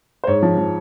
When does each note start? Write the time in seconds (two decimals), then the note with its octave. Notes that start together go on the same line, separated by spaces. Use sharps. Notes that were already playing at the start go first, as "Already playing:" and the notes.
0.24 C5
0.27 G#2 C#5
0.43 F3
0.58 F3